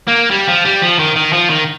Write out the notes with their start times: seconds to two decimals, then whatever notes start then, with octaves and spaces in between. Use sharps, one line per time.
0.08 A#3
0.31 G3
0.48 F3
0.65 G3
0.82 F3
0.99 D#3
1.16 D#3
1.33 F3
1.50 D#3